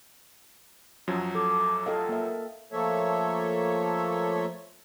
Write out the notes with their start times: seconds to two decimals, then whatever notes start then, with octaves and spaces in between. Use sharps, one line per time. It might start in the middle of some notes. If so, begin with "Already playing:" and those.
1.07 F#2 F3 F#3
1.35 A4 D6
1.86 A4 D#5 F5 G5
2.09 A#3 E5
2.72 F3 A3 A#3 A4 C#5 E5